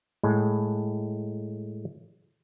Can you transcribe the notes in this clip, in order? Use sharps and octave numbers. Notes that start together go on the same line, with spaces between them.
A2 G#3